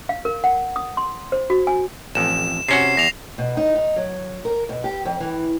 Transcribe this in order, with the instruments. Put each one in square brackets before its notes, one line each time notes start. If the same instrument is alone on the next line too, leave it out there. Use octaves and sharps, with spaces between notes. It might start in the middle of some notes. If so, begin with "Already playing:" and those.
[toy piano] F5
A#4
F#5
D#6
C6
C5
F#4
G#5
[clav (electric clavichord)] A1 F2 [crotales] E7
[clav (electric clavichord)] C3 C#4 F#4 [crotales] C7
[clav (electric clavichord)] E2 [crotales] A#6 F7
[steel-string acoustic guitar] B2
D#4
D#4
F#3
A#4
B2
G4
F2
E3